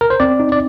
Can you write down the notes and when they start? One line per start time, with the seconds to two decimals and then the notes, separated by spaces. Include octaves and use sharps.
0.01 A#4
0.10 C5
0.20 C4 D5
0.40 D#4
0.52 D5